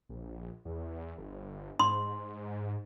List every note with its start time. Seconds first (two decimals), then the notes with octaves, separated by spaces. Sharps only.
0.09 A#1
0.65 E2
1.18 G1
1.79 G#2 C6